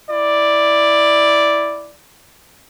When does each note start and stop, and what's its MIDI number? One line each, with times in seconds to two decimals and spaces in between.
0.10 1.95 64
0.10 1.95 74